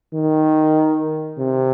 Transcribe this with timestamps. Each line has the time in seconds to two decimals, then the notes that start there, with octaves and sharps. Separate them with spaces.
0.14 D#3
1.39 C3